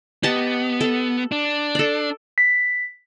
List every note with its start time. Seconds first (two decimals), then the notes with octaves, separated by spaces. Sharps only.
0.23 B3 G4 D#5 A5
0.81 A4
1.32 D4
1.75 A4 D5
2.38 B6